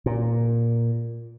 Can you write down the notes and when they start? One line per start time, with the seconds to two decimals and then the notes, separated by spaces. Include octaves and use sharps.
0.06 A#2